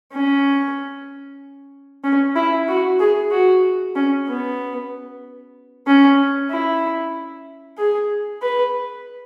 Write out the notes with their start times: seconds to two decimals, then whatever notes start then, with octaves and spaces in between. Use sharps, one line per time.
0.13 C#4
2.04 C#4
2.36 E4
2.69 F#4
3.00 G#4
3.32 F#4
3.96 C#4
4.28 B3
5.87 C#4
6.51 E4
7.78 G#4
8.42 B4